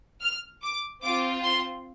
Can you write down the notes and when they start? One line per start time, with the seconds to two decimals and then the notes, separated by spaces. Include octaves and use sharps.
0.22 F6
0.63 D6
1.03 C4 F4 D6
1.44 C6